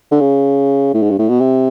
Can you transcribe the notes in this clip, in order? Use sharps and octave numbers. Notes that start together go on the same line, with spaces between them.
D3
C#3
A2
G#2
G2
A2
B2
C3